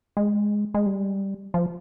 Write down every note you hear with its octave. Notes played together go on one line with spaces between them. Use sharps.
G#3
G#3
G3
F3